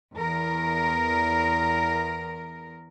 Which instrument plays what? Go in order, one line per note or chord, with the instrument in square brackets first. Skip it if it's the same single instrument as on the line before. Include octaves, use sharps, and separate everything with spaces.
[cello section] E2 A#4